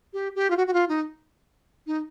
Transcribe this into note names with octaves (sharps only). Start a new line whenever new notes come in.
G4
G4
F4
F#4
F#4
F4
D#4
D#4